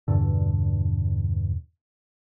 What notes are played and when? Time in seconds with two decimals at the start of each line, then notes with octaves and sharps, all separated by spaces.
0.08 E2 G2 B2 D3